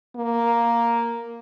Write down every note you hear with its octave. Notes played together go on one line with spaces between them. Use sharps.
A#3